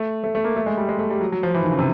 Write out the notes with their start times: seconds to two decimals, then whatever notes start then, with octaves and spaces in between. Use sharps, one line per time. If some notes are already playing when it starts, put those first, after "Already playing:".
Already playing: A3
0.24 A3
0.35 A3
0.44 A#3
0.57 A3
0.66 G#3
0.77 G3
0.89 G#3
0.99 A3
1.10 G3
1.21 F#3
1.32 F#3
1.43 F3
1.54 E3
1.62 D#3
1.70 C#3
1.78 C3